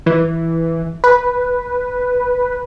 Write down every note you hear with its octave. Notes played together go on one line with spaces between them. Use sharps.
E3
B4